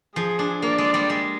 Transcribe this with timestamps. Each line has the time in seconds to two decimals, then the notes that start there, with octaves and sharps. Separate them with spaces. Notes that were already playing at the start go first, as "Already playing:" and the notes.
0.16 F3 G#4
0.39 D4
0.62 A#3 D5
0.78 G#3
0.94 G3
1.10 G#3